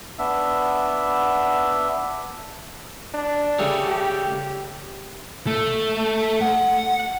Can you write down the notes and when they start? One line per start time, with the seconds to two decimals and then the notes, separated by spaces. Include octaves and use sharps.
0.19 B3 D4 E5
3.14 D4
3.59 C#3 G3 A3
3.87 G4
5.47 A3
6.41 F#5